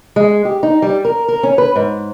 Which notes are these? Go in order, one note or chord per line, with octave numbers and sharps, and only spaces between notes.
G#3
G4
D#4
G3
A#4
A#4
C#4
B4
G#2